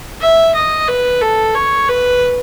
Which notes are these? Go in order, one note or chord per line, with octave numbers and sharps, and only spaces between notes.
E5
D#5
B4
A4
C#5
B4